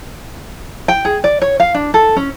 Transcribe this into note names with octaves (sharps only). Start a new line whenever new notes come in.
G5
G#4
D5
C#5
F5
D4
A4
C#4